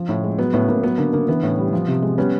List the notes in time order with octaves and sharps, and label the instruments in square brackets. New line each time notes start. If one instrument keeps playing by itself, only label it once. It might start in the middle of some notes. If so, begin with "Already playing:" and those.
Already playing: [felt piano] F3
A2
G#3
F#3 B3
A2 B3
A2 A#3
F#3 B3
D3 A#3
D3 A#3
E3 B3
A2
G3
F3
C3
G#3
G3 B3 C#4